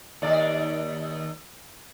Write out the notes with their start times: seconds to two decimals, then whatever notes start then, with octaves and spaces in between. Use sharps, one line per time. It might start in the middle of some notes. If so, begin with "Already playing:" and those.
0.22 D#2 D5